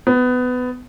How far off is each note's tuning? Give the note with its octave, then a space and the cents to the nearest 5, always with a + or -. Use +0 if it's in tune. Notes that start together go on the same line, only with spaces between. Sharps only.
B3 +20